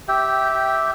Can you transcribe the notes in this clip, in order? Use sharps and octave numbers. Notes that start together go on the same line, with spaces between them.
G4 E5 G5